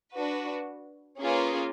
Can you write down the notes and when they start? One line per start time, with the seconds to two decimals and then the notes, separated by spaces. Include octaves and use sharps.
0.13 D4 F#4 B4
1.21 A#3 C#4 F4 G#4 B4